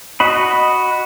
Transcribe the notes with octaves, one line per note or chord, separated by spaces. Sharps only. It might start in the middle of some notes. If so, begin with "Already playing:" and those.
F#4 D#5 B5